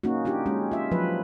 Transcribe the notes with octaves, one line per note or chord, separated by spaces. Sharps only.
A#3 C#4 D#4 F#4
D4 D#4 F4 G4
G#3 C#4
F4 E5
F3 F#3 B4